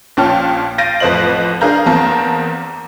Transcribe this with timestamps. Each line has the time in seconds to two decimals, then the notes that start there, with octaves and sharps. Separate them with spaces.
0.17 A#1 A#2 C#4 G5 A5 F6
0.78 F5 G6 A6 A#6 D7 D#7
1.00 A1 F2 B4 C5 D#5 F#7
1.61 D4 G#4 A#4 F5 A#5 G6
1.86 E2 A#3 C4 A5 A#5